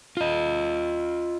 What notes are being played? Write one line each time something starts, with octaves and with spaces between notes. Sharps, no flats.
F4 D#5